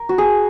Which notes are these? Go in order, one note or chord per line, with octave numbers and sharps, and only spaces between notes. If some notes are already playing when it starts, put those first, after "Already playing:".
Already playing: A#4
F#4
G#4